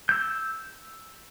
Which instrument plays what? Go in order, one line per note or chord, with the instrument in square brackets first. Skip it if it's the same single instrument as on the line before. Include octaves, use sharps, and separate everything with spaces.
[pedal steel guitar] E6 G6